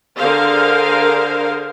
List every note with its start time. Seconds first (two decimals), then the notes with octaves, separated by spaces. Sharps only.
0.17 D3 G#4 A#4 C5 F5